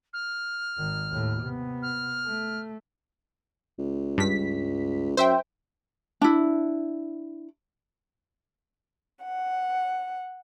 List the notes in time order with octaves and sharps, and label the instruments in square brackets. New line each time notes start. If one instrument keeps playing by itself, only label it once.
[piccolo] F6
[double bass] G#1 D#3
D#2 A2
C3 B3
[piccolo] F6
[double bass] A3
[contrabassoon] C#2
[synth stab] G2 B6
[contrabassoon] F#2 [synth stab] C5 E5 G5
[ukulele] D4 E4
[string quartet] F#5